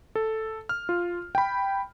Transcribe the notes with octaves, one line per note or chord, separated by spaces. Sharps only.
A4
F6
F4
G5 B5